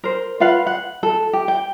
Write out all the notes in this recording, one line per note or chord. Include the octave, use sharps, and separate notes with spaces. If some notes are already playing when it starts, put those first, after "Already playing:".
A#4 C5
F4 B4 F5 F#5
F#5
A4
G4
G5